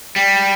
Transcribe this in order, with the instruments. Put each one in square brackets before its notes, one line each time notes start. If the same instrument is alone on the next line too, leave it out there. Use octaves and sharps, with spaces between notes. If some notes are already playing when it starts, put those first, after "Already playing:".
[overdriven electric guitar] G3